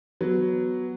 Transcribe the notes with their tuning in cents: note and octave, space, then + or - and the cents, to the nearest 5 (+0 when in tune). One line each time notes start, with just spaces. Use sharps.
F#3 +0 B3 +0